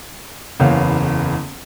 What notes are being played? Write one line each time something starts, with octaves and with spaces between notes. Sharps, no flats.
F#1 E2 B3 C#5 F5 F#5